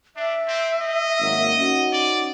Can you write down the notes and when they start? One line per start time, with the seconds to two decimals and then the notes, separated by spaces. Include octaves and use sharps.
0.16 D4 E5
0.48 C4
0.81 D#5
1.21 G#1 F#3 A#3
1.58 C#4 D#4 F#4
1.93 D5